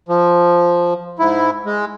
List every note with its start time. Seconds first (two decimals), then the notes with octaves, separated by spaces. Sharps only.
0.09 F3
1.19 G#2 E4
1.66 G#3